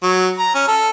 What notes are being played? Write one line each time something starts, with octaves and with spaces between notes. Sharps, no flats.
F#3
A#5
C#4
A4